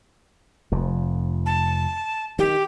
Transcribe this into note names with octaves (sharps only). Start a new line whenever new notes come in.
F1 F2
A5
D#3 G4